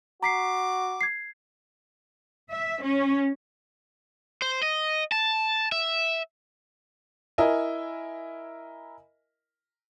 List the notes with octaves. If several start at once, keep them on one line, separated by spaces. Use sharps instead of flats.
F#4 A#5 D6 B6 C7
G#6 C7
E5
C#4
C5
D#5
A5
E5
E4 A#4 D#5 E5 G#5